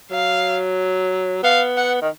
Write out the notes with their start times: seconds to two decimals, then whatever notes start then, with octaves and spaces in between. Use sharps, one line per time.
0.11 F#3 F5
1.43 B3 F5
1.77 F#5
2.02 D#3